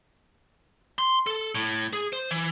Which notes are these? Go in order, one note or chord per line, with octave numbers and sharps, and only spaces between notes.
C6
A4
A2
G#4
C5
E3